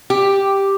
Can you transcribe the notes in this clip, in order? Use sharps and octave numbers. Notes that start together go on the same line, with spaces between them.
G4